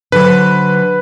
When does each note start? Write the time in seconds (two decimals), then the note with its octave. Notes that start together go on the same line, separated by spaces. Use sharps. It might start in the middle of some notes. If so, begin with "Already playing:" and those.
0.12 D3 F#3 B4 C5